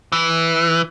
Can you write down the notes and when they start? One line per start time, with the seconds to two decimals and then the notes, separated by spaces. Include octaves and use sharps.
0.12 E3